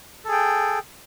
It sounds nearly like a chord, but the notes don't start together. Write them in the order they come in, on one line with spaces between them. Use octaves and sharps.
A4 G#4 G5